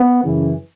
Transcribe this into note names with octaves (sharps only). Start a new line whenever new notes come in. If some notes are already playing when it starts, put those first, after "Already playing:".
Already playing: B3
F#2 C#3 E3